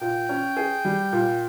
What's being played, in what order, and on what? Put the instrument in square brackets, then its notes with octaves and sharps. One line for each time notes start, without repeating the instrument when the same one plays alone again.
[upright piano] A#2 [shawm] G5
[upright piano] C#4
G#4
G3
A#2